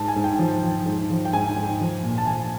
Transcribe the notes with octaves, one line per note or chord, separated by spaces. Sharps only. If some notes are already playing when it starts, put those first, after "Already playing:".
Already playing: G#2 A5
G#5
G#2
G5
F3
F3
G#2
F3
G5
G#2 G#5
G#2
F3
A#2
A5
F3 G#5